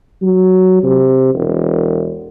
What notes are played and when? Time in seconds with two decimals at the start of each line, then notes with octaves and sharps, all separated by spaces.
0.22 F#3
0.83 C3
1.35 E1